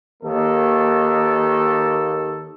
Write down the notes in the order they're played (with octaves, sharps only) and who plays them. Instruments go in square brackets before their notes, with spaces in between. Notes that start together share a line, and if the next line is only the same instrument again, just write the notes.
[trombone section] D#2 D#3 A#3 A4